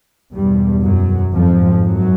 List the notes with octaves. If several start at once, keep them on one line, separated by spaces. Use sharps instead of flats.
E2 G2 B2 G3
F#2 F#3
F2 G#2 F3
F#2 F#3